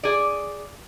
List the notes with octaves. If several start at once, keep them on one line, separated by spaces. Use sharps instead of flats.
G#4 D5